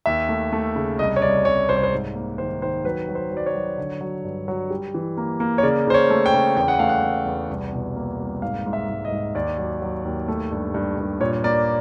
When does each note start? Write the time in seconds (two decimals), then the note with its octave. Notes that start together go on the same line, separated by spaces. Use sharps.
0.06 D#2 E5
0.29 A3
0.53 A3
0.76 C#3
0.99 C2 D#5
1.16 C#5
1.22 C2 D5
1.45 C2 C#5
1.69 C2 C5
1.76 C#5
1.83 C5
1.93 G#2
2.15 A#3
2.38 D#3 C5
2.62 D#3 C5
2.84 F#3 B4
3.09 F#3
3.15 C5
3.32 F#3
3.37 D5
3.46 C#5
3.55 F#3
3.78 D3
4.01 F#3
4.24 G2
4.48 F#3
4.70 G3
4.94 E3
5.17 A#3
5.40 A#3
5.58 C#5
5.63 C#3 D5
5.87 C#3 C5
5.94 C#5
6.10 A3
6.26 G5
6.34 C#3
6.57 E2 G5
6.68 F#5
6.79 A3 F5
6.89 F#5
7.02 E2
7.26 E2
7.49 C2
7.73 B2
7.96 A#3
8.19 C2
8.42 G#2 F5
8.66 G#2
8.73 E5
8.89 G#2
9.05 D#5
9.11 G#2
9.35 D#2 D5
9.58 F#3
9.82 F#3
10.05 D#2
10.28 A3
10.52 G2
10.74 G2
10.98 G2
11.20 A#2 C#5
11.44 A#3 D5